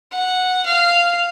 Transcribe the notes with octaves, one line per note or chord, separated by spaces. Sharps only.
F#5
F5